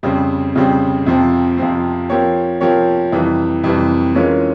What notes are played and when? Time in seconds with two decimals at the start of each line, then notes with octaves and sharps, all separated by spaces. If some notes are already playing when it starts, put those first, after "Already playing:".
0.03 F2 C#3 G3 C4
0.55 F2 C#3 G3 C4
1.06 F2 C3 F3 C4
1.58 F2 C3 F3 C4
2.10 F3 C4 G4 A#4 C#5
2.61 F3 C4 G4 A#4 C#5
3.12 F2 C3 E3 G3
3.64 F2 C3 E3 G3
4.14 E3 G#3 C#4 F4 A#4